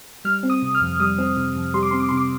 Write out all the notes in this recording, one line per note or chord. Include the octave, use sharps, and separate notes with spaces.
G3 F6
C4
D#6
C3
F6
F2
G3 D#6
C4
C3
F2
G3 C6
D6
C4 C6
D6
C3 C6
D6